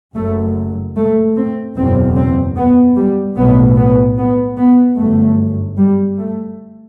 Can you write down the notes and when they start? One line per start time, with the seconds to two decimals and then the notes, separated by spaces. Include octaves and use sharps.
0.15 F#1 F#2 A3
0.96 A3
1.36 C4
1.77 F#1 E2 B2 C4
2.17 C4
2.57 B3
2.96 G3
3.37 B1 A2 B3
3.77 B3
4.18 B3
4.58 B3
4.98 G1 F#2 A3
5.78 G3
6.18 A3